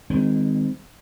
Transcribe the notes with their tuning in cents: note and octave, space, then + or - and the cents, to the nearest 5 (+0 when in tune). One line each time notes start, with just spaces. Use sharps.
D#3 -5 G#3 -35 C4 -30